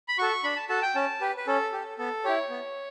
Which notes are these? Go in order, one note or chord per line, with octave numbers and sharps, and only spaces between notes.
B5
F#4 A4 C#6
D4 B5
A5
F#4 A4 A5
G5
C#4 A5
G4 B4
B4
C#4 A4
G4
B3 A4
E4 G4 C#5
B3